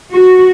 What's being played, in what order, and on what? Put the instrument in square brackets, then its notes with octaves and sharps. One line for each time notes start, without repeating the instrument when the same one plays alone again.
[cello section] F#4